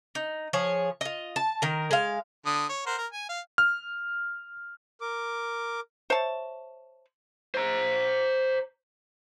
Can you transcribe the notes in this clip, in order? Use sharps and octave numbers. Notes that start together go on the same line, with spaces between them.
D#4
F3 G#4 C#5
F4 D#5
A5
D#3 A#4
G#3 F5
D3 D#6
C#5
A#4 C5 F#5
A#4
G#5
F5
F6
A#4 D6
C5 C#5 E5 A5
C5 A#5